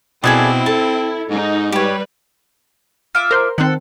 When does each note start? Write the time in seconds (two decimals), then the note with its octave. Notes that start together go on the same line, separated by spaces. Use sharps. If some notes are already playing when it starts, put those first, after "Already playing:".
0.24 B2 C4 E4 G#4 A4 D5 G#6
0.66 A4 A5
1.30 G#2 D#4
1.72 G3 G4 B4 C#5
3.15 F4 E5 D6
3.31 A#4 C5 C6
3.58 D#3 C4 A4 F#5